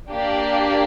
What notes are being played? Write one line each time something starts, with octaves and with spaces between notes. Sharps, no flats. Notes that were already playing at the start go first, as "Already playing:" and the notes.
A#3 D4 G4 D5